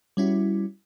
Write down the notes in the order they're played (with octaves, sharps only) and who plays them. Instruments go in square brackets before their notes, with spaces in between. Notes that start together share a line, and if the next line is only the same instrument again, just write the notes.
[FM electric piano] G3 C#4 E4 F#4